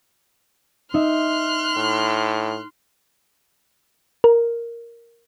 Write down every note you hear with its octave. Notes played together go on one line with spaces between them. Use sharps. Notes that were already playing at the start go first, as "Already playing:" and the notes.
D#4 E5 C6 F6 F#6
A2
A#4